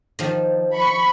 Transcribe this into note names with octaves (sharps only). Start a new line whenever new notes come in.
D#3 F3
B5 C#6